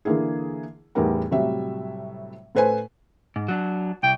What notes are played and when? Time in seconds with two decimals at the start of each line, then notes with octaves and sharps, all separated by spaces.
0.05 D3 E3 A#3 E4 G#4
0.95 E2 A2 G3 B3 D#4 A#4
1.31 A2 C3 F#3 G3 E5
2.55 A2 A4 B4 C5 G#5
3.36 G#2
3.48 F#3 D4
4.03 C2 G5